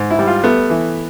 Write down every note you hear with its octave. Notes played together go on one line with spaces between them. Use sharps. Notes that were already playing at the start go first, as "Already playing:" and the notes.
Already playing: G#2
E4
G3
F4
A3 B3
E3